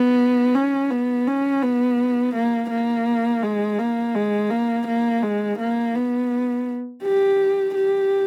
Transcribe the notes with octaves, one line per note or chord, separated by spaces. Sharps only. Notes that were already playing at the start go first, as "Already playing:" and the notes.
Already playing: B3
C#4
B3
C#4
B3
A#3
A#3
G#3
A#3
G#3
A#3
A#3
G#3
A#3
B3
G4
G4